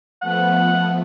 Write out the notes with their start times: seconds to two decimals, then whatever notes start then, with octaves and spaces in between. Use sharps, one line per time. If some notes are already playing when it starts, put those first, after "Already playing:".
0.22 F3 A3 B3 F#5